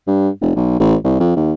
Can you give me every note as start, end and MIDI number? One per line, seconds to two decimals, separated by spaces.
0.07 0.29 43
0.41 0.52 29
0.56 0.78 35
0.80 0.95 33
1.04 1.16 36
1.20 1.33 41
1.36 1.53 39